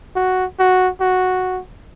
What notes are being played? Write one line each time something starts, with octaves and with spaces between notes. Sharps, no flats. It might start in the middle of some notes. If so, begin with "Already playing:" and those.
F#4
F#4
F#4